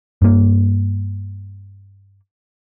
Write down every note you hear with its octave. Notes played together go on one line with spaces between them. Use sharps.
G2 A#3